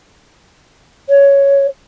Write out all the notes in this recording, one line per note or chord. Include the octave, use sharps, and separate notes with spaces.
C#5